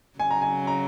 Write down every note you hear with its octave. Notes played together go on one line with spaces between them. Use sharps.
C#3 F#3 G#5
A#5
G#5
A#5